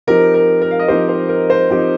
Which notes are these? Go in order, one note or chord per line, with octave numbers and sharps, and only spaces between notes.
F3 C4 D#4 G4 A#4
A#4
A#4
F5
D#5
F3 C4 D#4 G4 C5
C5
A#4
C5
F3 C4 D#4 G4